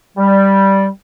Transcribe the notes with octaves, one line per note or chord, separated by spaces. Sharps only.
G3